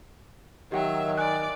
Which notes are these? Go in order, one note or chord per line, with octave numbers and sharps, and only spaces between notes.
D#3 F#3 G4 E5 F#5 G5
D5 G#5 F#6